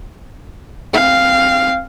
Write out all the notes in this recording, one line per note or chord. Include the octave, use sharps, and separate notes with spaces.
C4 F5